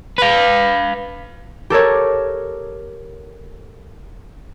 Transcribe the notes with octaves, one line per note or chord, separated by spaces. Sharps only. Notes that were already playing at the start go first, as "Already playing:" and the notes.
B4 F5
G4 A4 A#4 C#5